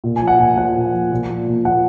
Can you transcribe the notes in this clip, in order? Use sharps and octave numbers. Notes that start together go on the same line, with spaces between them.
A#2
G#5
F3
F#5
A#2 G#5
F3 F#5
A#2
F3
A#2
F3
A#2
F3 F#5